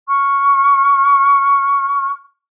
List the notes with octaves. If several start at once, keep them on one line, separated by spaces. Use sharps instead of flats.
C#6 F6